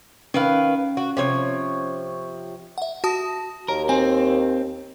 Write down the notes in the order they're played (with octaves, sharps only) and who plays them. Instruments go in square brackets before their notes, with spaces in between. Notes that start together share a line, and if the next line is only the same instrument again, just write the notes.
[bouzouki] D#3 B4 F5 [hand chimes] C#4
[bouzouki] F#4
C3 F3 C#5
[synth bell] E5 F#5
F#4 A5 D#6
[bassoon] D#2 [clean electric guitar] A#4
[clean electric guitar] C4 [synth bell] G#5